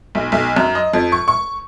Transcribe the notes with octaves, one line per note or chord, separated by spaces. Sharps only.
B1
B1
F#2
D#5
F2
C#6
C#6